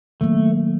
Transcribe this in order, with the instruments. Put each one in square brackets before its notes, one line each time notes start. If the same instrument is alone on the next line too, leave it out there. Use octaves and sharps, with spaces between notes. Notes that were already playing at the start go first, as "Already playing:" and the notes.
[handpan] D#3 F#3 A#3 [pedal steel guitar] A3